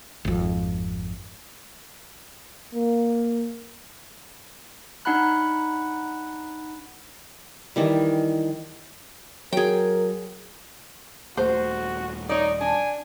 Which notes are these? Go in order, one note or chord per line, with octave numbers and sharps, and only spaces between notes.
G#1 F2
A#3
D4 D#4 F#5 A5 B5 F#6
D#3 E3 G3
F#3 G#4 A#4 G5
D#1 A3 F#4 C5
D#4 C#5 D5
D4 G#5